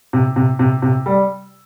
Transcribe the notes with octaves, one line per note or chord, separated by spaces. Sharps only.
C3
C3
C3
C3
G3